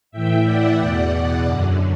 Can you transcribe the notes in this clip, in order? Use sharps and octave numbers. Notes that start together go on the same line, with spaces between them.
A2 E3 E5 G5
D5 F#5
E2 B2
F#2 D3